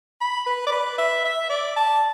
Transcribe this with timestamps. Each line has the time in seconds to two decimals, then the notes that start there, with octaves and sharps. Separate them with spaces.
0.21 B5
0.46 B4
0.67 D5
0.72 B4
0.98 E5
1.25 E5
1.49 D5
1.76 A5